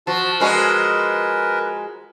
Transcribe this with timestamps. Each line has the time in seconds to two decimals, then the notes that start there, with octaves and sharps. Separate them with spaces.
0.07 F3 F#4 A5
0.40 F3 G#3 F#4 A#4 B4